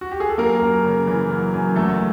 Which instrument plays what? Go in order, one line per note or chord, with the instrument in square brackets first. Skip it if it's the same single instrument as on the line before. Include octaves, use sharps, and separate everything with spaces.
[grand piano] F#4
G4
G#4
A4
F#2 A#3 A#4
F#2
C#3
E3
F#2
F#2
E2 A3 A4